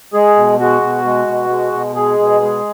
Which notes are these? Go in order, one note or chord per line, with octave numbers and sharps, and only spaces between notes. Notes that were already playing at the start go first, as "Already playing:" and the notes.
G#3 G#4
B2
G#3 F#4
B2
G#3
B2
G#3
B2
G#3 G#4
B2
G#3